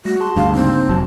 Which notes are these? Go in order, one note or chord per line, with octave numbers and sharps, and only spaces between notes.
G3 A3 F#4 A#6
G#4 A5 C6
D2 G2 F5
C#3 A#3 C4 D#4
F1 F#3 A5